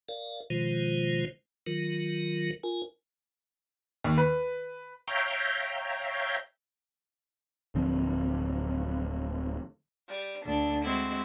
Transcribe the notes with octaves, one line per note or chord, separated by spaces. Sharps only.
A#4 D5 F5
B2 D#3 F3 G#3 F4 C5
D#3 F#3 F4 A#4
F4 A#4 G#5
D#2
B4
C#5 E5 F5 G5 A#5 G6
D1 D3 F3 C4
G3
D2 D4
G#3 C4 E4 F#4